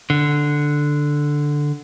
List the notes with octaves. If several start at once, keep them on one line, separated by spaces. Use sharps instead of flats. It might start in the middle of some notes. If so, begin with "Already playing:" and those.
D3